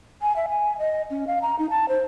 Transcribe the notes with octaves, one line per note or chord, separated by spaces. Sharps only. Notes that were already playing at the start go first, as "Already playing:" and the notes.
G#5
E5
G#5
D#5
C#4
F5
A#5
D#4
A5
C5